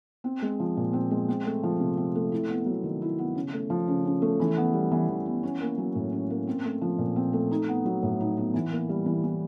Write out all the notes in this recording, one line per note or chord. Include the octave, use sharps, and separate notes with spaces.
C4
G#3
F3
A#2
C4
G#3
C4
A3
F3
C3
C4
A3
E4
B3
F#3
D#3
E4
B3
C#3
A3
F3
C#3
C#3
A3
E3
B3
G3
E3
E3
B3
C#4
A#3
F#3
A2
C#4
A#3
C4
A3
F3
A#2
C4
A3
D#4
B3
F#3
A2
D#4
B3
E3
A#3
G3
E3
E3